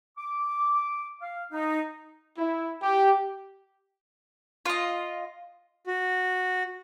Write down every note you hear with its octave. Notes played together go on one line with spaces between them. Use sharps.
D6
F5
D#4
E4
G4
F4 D#5
F#4